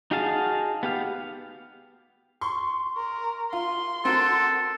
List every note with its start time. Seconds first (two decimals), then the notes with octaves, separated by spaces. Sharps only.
0.11 D#4 F#4 G#4 F5 A5
0.83 B3 G4 F5
2.41 C6 C#6
2.97 A#4
3.53 F4 C6
4.05 C4 F#4 A4 A#4